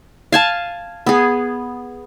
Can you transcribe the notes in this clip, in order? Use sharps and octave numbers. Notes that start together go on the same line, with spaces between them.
F5 G#5 A5
B3 G#4